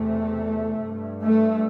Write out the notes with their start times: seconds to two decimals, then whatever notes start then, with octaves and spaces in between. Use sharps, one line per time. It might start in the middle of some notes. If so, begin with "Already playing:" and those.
Already playing: E2 C3 A3
0.84 G2
1.24 A3